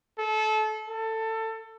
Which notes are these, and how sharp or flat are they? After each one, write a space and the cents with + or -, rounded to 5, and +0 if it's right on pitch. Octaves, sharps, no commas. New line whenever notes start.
A4 -25
A4 +20